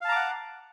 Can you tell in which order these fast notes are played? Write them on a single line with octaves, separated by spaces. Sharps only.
F5 A5 A#5 D6 F#5